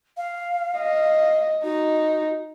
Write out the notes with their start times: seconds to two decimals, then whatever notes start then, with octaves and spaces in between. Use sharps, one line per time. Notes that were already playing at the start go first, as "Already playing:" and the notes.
0.17 F5
0.79 D#5
1.64 D#4 F#4